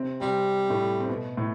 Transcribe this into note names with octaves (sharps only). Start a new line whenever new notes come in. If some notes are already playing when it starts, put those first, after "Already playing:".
Already playing: C3 C4
C3 G3 C4
A2 A3
C4
B2 B3
A2 A3